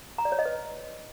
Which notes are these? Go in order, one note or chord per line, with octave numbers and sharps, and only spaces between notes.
A#5
D5
C#5
D#5
B4